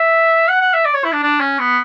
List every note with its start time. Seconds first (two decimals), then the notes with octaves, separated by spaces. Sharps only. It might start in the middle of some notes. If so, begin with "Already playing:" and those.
Already playing: E5
0.48 F#5
0.61 F#5
0.74 E5
0.85 D5
0.94 C#5
1.05 E4
1.13 D4
1.23 D4
1.40 C#4
1.59 B3